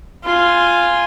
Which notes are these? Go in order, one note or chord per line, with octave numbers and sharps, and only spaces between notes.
F4 G#5